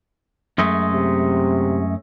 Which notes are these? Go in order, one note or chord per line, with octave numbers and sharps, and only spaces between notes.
F#2 G#3 A3
C3